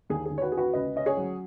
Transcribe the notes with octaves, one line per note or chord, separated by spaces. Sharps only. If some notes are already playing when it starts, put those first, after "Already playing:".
D#2 G#4
G#4
D#2
C#5
F#4 B4
C#4 G#4
F#4 B4
C#2 B4 D#5
C#4 D#5
G#4 C#5
F#3